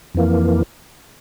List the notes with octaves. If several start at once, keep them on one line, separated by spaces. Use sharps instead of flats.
F2 E3 A#3